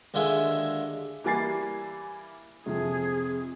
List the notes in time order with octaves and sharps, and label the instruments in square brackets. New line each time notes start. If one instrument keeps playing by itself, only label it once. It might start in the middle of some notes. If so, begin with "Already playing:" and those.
[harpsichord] D#2 D3 G#3 F4 E5 G#5
[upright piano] E3 G3 A#3 G#5 A6 C7
[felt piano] F2 C3 F3 [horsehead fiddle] G#4